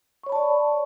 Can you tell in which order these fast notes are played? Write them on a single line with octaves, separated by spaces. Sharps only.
C#6 C#5 B5 A5 D5